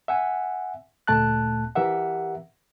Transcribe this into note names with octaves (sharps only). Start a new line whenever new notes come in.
E5 F#5 G#5
D2 A#2 A3 A5 F#6
E3 G4 A#4 E5 F#5